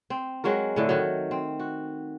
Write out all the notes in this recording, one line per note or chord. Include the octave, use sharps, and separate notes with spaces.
C4
F#3 G#3 F#4 A#4
A2 D3 A3
D#3 F#3
C4
F#4